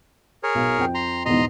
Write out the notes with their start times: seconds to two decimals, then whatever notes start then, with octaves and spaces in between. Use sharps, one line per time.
0.43 G#4 A#4 C#5
0.55 B1
0.78 F2 G5
0.95 A#5 C6
1.26 E2 G#2 B2 D#5 A#5 C6